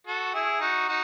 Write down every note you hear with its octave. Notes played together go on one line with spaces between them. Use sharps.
F#4 A4
E4 G#4
D#4 F#4
D#4 F#4